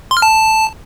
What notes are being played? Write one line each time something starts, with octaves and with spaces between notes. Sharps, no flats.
C6
F6
A5